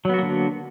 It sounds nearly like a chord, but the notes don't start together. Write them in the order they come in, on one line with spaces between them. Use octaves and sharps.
F#3 B3 F#4 A#3 D3